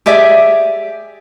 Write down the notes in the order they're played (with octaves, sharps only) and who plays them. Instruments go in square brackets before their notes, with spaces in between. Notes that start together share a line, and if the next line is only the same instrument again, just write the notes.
[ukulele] G4 G#4 D5 E5